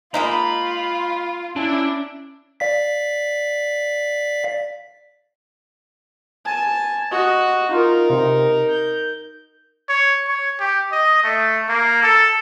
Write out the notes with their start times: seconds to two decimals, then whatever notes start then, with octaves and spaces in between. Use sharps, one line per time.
0.14 G#3 A#3 D#4 F4 B5
1.56 C#4 D4 E4
2.60 D5 F5 B6
6.45 G#5 A5
7.11 F#4 D#5
7.71 D#4 F4 A#4
8.10 C3
8.68 G6
9.89 C#5
10.28 C#5
10.60 G4
10.92 D#5
11.24 A3
11.69 A#3
12.03 A4